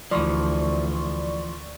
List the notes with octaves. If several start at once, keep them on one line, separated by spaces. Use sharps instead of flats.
D2 E3 F3 D5 C6 C#6